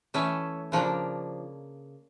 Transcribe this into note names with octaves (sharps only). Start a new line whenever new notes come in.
E3 A3 C#4 E5
C#3 F3 A#3 D4